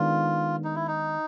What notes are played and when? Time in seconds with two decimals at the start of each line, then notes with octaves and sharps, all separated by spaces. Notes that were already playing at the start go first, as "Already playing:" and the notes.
Already playing: D#3 G#3 B3 D4 F4
0.64 D#4
0.75 E4
0.87 D#4